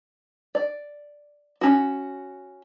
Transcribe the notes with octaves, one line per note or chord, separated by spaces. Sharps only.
D5
C#4 F#4